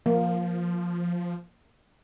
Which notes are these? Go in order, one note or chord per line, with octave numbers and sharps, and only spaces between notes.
F3 A#3